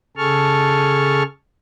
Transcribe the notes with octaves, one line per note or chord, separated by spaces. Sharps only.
C#3 G#4 A4 A5 C#6 F6